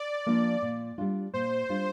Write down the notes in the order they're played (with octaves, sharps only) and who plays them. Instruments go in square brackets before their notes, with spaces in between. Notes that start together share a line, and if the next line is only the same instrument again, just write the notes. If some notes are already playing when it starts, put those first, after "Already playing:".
Already playing: [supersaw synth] D5
[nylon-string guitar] F3 A#3 D4 F4
A#2
G3 D4 F4
[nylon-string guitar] A#2 [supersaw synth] C5
[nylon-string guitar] G3 D4 F4